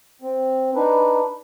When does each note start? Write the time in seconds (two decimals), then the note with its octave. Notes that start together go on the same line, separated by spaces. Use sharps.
0.22 C4
0.75 D4 D#4 B4